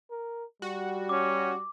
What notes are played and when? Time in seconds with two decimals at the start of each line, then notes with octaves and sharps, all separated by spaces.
0.11 A#4
0.62 G3 F#4
1.09 C#4 D6